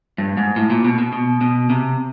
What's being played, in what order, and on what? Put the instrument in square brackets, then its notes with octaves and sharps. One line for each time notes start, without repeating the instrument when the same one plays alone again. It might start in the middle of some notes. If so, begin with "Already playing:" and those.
[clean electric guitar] G2
G#2
A2
A#2
B2
B2
B2
B2
C3